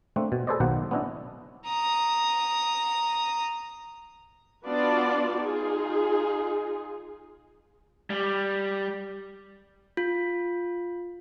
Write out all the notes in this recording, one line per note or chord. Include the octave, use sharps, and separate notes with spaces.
A3 A#3 C4 D4
B2
G#4 A4 B4 C5 D5 D#5
B1 B2 D#3 A#3 C5 F#5
B3 C#4 D4 E4 D#5
A#5 D#6
B3 D4 F4 F#4 D5 A5
D#4 F4 G#4
G3
F4